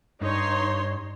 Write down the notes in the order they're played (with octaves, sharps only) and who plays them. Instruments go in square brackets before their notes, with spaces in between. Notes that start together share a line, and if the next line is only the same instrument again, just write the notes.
[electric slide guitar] G2 [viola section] D#4 C#5 C6